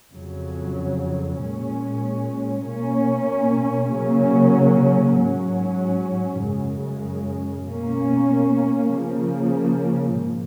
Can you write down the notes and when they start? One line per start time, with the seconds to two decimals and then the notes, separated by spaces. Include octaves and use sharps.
0.11 F2 C#3 F#3
1.37 A#2 G#3 C#4
2.62 B2 A#3 C#4
3.89 C#3 F#3 A#3 C#4
5.15 G#2 F#3 C#4
6.39 F#2 C#3 G#3
7.65 B2 A#3 C#4
8.91 C#3 F3 A#3
10.16 G#2